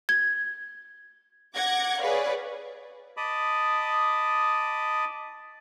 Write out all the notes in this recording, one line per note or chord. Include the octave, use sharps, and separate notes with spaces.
G#6
F#5 D6 G#6 A#6
G#4 B4 C#5 D5 F5
D#5 A5 B5 D6 D#6